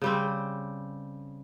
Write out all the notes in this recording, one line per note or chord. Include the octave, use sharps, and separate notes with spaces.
C#3 G3 C4